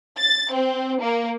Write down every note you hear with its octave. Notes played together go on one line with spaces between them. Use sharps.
A6
C4
A#3